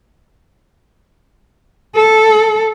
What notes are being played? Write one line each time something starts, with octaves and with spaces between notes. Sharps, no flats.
A4